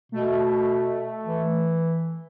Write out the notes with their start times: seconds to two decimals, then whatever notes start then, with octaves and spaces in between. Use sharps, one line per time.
0.12 B2 A3
1.25 E3